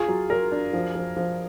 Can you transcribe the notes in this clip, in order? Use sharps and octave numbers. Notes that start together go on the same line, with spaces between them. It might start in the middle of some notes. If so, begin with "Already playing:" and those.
Already playing: F4 G#4
F#3
F#3 A#4
D4
F3
F3
F3